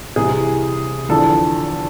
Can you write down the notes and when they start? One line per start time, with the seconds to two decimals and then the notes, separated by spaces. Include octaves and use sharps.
0.16 C2 C3 E3 G#4
1.09 E2 D3 F3 A4